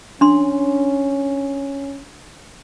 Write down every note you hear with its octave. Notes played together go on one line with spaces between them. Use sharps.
C#4 D4 C6